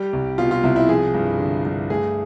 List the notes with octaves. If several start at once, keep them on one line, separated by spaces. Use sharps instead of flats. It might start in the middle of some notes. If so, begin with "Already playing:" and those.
Already playing: G3 G4
C2
B2 F4
F4
C2 E4
E4
F3 G#4
G2
D3
G2
A3 G#4